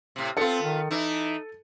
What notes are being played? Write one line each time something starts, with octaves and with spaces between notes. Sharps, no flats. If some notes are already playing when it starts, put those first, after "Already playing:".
A2 C3
B3 C4 F4 A4 C#7
D#3
E3 D#4 E4